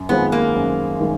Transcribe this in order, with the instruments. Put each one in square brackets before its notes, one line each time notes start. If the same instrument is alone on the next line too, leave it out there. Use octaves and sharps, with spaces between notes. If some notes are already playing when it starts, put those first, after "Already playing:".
Already playing: [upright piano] F#2
[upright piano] D#3 G#3 C4 F4 [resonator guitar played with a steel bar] B3
[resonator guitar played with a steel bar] A#3
[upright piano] F#2
D#3 G#3